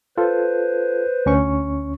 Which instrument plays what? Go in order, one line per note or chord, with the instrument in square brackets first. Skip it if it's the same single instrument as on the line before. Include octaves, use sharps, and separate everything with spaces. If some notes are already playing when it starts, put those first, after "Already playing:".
[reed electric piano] F4 A4 [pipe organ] B4 C5
[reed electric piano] D2 C#4 C#6